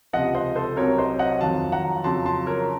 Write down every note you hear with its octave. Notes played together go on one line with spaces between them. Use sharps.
C#2 C3 F3 D#5 F#5
C5 D#5
A4 C5
C2 C3 F#3 A#4 C#5
C5 D#5
D#5 F#5
F2 D#3 F#3 F5 A5
F#5 A#5
F2 C#3 F#3 A5 C6
A5 C6
A#4 C#5